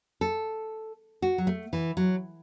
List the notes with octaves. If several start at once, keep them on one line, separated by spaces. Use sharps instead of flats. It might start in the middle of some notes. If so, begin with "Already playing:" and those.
A4
F#4
F#3
A3
E3
F#3